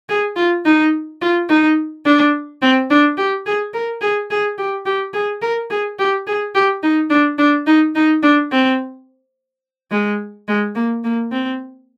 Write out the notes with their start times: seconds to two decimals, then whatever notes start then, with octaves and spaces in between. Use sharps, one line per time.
0.09 G#4
0.36 F4
0.65 D#4
1.22 F4
1.49 D#4
2.05 D4
2.62 C4
2.90 D4
3.18 G4
3.46 G#4
3.74 A#4
4.02 G#4
4.30 G#4
4.58 G4
4.86 G4
5.14 G#4
5.42 A#4
5.70 G#4
5.99 G4
6.27 G#4
6.55 G4
6.83 D#4
7.10 D4
7.38 D4
7.67 D#4
7.95 D#4
8.23 D4
8.52 C4
9.91 G#3
10.48 G#3
10.75 A#3
11.04 A#3
11.31 C4